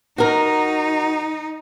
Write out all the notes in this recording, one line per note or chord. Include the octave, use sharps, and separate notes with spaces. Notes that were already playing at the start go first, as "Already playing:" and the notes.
D#4 F#4 A#4